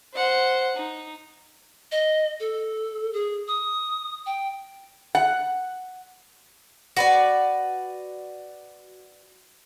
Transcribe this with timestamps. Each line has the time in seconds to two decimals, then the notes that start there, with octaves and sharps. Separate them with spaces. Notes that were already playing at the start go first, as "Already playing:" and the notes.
0.14 C5 F#5
0.77 D#4
1.92 D#5
2.40 A4
3.13 G#4
3.48 D#6
4.26 G5
5.15 F#5
6.97 F#4 B4 D5